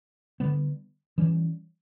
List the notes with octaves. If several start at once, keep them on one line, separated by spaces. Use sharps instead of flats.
D3 G3 B3
E3 G3 C#4